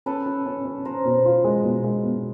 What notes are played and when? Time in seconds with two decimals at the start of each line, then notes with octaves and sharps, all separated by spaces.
0.06 C#4 A4 B4
0.26 C#4
0.46 C#4
0.65 C#4
0.85 C#4 A#4 C5
1.05 B2
1.25 F4
1.44 G#3
1.64 B2
1.84 G#3
2.04 B2